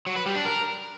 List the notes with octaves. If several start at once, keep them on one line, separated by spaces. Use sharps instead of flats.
F#3
B4
G3
D4
A#4